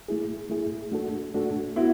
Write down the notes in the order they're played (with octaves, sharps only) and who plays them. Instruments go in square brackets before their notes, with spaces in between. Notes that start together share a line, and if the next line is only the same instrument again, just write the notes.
[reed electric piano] A3 E4 G#4
A3 E4 G#4
A3 D4 F#4 A4
A3 D4 F#4 A4
[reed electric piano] B3 F#4 [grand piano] E4